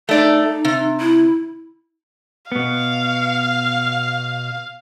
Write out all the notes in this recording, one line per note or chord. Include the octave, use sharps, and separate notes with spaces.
A3 D#4 D5
C3
E4
B2 B3 F5